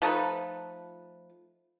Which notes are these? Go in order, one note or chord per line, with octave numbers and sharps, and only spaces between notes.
F3 A3 D#4 B4